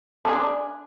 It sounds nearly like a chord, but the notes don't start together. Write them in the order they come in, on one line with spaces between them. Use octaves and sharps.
A4 G#4 D4